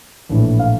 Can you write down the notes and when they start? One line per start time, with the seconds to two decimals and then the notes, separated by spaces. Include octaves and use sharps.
0.29 A#1 A2 E3
0.59 F5